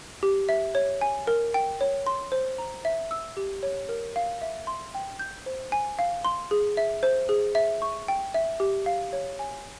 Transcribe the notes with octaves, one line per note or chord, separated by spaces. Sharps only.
G4
E5
C#5
G#5
A#4
G5
C#5
C6
C5
A#5
E5
E6
G4
C#5
A#4
F5
E5
C6
G5
G6
C5
G#5
F5
C6
G#4
E5
C5
G#4
E5
C#6
G5
E5
G4
F5
C#5
G#5